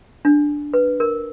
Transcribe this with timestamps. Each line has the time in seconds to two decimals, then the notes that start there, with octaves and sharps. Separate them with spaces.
0.25 D4
0.74 B4
1.00 A#4